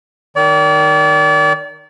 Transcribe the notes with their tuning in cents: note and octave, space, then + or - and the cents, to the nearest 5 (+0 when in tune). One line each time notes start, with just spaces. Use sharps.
D#3 -10 D5 -35